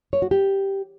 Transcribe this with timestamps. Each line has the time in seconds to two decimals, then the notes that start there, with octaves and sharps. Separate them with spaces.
0.13 C#5
0.22 F#4
0.31 G4